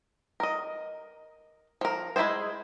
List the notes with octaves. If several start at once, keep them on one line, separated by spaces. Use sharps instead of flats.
A#4 D#5
F3 A#4
G#3 E4 F4 G#4 C5